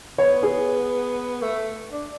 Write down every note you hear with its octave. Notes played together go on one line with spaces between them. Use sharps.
B3 C#5
G#4
A3
D4